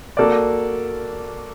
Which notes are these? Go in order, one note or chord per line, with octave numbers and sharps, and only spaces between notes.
A#3 F#4 A4 D5